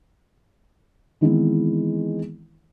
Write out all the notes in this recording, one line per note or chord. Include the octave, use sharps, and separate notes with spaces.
D#3 E3 G#3 B3 C4 E4